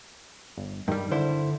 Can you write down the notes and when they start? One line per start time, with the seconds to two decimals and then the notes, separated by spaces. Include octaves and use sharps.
0.58 G1
0.88 G2 D#3 G3
1.12 D3 E4 C5